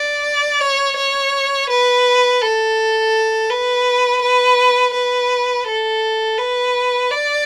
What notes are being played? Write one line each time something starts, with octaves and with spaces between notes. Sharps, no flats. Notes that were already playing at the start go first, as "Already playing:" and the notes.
Already playing: D5
C#5
C#5
B4
A4
B4
B4
B4
A4
B4
D5